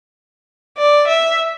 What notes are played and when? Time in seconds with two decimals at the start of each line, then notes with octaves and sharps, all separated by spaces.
0.78 D5
1.08 E5